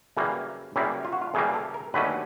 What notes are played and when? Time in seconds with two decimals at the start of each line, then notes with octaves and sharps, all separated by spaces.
0.17 F#2 C#3 E3 G3 A#3
0.76 F#2 C#3 E3 G3 A#3 E4
1.05 F4
1.13 F#4
1.22 F4
1.34 F#2 C#3 E3 G3 A#3 G#4
1.54 A4
1.74 A#4
1.94 D#2 D3 F#3 A3 C#4 B4